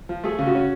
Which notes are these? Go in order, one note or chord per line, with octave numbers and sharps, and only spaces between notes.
F3
A3 G#4
C#3
F#4
C#4